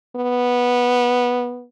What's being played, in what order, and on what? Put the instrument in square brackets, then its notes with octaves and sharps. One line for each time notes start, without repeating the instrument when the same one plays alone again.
[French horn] B3